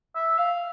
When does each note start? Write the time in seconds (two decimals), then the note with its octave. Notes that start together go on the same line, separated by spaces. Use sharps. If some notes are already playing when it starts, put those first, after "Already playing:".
0.15 E5
0.38 F5